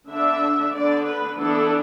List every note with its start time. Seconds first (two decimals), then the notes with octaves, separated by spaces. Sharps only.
0.09 D3 B3 D4 E5
0.73 D3 B3 D4 D5
1.05 B4
1.37 E3 B3 D4 A4